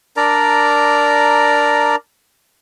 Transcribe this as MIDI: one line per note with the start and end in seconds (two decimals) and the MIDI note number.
0.17 1.96 62
0.17 1.96 70
0.17 1.96 74
0.17 1.96 82